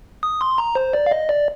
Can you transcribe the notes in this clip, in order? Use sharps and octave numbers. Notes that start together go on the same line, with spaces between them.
D#6
C6
A#5
C5
D5
F5
D#5
D5